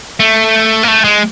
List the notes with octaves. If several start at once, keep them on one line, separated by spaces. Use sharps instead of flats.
A3
A#3
A3
G#3